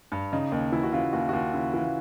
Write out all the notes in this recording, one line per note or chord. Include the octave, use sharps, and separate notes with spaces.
G2
C#3 D#4
D#2 D#4
E3 E4
F#4
C#3 F4
D#2 F#4
F#4
D#2 F4
C#3 E4
E3 F4